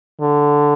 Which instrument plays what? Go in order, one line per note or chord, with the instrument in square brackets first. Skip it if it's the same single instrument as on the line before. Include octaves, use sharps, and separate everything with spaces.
[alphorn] D3